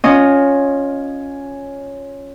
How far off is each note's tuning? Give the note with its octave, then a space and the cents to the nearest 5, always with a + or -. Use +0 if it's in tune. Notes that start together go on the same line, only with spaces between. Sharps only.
C#4 +0 F4 +15 D#5 -10